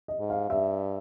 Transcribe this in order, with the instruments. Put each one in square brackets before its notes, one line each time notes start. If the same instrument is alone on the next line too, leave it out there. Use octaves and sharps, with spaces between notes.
[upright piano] D#5
[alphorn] G#2
[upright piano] F5
[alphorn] G2 [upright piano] E5